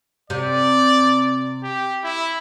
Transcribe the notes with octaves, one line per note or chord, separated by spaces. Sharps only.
C3 D5
G4
E4